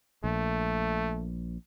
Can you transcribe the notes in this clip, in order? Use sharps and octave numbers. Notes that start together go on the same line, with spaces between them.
A#1 A3